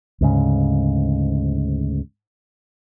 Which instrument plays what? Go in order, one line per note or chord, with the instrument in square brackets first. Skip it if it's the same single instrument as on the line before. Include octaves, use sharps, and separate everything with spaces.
[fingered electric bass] D2 G#2 C#3